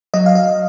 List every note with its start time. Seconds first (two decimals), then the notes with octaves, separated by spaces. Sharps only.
0.14 F#3 D#5
0.26 F5
0.35 D#5